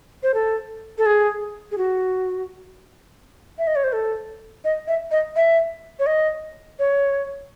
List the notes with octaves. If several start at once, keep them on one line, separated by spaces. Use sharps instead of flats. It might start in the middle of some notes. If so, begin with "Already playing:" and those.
C5
A4
A4
G#4
G#4
F#4
E5
D#5
C#5
C5
A4
D#5
E5
D#5
E5
C#5
D#5
C#5